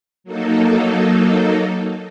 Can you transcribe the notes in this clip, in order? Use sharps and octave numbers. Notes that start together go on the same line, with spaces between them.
F#3 A#3 D#4 A4